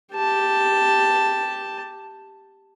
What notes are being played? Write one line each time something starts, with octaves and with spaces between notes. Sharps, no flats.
G4 A5